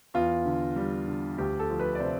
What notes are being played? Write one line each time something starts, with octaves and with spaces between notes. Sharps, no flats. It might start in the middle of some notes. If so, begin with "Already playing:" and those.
E2 F4
D3
G3
D3
D2 G4
A4
F3
B4
D5
C3 C5